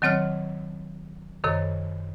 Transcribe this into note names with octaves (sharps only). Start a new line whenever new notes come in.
D#3 F#3 C4 C#5 F6
F#2 C3 D#3 A4 C#5